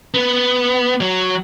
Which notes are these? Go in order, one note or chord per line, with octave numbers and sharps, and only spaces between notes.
B3
F#3